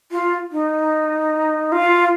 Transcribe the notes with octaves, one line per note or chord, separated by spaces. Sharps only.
F4
D#4
F4